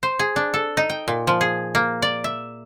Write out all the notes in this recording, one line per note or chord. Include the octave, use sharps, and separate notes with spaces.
C5
G#4
D4
A4
D#4
G5
A#2
F3
G#4
A#3
D5
E5